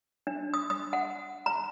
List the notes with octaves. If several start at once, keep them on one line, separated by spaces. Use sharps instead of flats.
D4
D#6
D#6
F#5
A#5